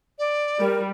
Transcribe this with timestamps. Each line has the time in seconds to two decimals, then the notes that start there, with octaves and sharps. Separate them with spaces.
0.19 D5
0.60 G3 A#4